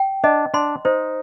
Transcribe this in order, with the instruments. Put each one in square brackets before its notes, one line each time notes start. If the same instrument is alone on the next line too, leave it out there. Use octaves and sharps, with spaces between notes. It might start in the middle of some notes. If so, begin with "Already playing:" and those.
Already playing: [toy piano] G5
[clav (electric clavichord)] D4 [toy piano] D#5
[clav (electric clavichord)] D4 [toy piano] C6
[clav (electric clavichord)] D#4 [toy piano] C5